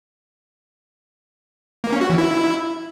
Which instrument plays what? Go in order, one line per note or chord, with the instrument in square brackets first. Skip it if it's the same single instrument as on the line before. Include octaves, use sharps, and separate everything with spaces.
[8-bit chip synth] A#3
C#4
F#4
E3
E4